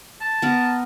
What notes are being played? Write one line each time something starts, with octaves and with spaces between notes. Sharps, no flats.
A5
B3 A#4